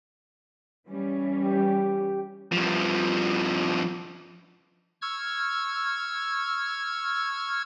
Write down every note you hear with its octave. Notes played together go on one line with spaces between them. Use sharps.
E3 G3 C#4
G4
G2 F3
C#6 E6 F6 G#6